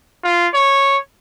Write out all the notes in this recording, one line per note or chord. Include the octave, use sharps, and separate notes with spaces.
F4
C#5